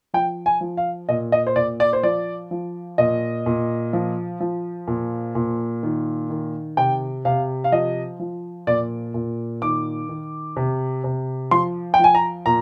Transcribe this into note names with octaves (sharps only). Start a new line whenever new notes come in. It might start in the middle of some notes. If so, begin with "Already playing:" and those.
F3 G5
G#5
F3
F5
A#2 D#5
D#5
C5
A#2 D5
D5
C5
F3 D5
F3
A#2 D#5
A#2
F3
F3
A#2
A#2
D#3
D#3
C3 G5
C3 F5
F5
F3 D#5
F3
A#2 D5
A#2
D#3 D6
D#3
C3
C3
F3 C6
G5
F3 G#5
A#5
A#2 A#5